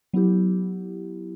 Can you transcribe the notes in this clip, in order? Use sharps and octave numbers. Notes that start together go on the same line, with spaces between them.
F#3 B3 E4 G4